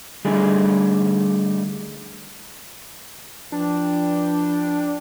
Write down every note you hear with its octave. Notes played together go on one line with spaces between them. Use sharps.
D3 G3 A3 D#4 G#4
F3 D4 B4 G5